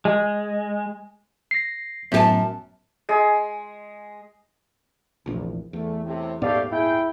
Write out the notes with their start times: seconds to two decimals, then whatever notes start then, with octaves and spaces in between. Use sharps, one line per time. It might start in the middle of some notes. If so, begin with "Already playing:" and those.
0.05 G#3
1.51 A#6 C7
2.12 G#1 F#2 A2 B3 G4 A5
3.09 G#3 G#4
5.26 F1 A#1 E2
5.73 E2 A3
6.04 A2 C3
6.42 D#1 G#2 A3 B3 G4 D5 F5
6.71 E4 G#4 G5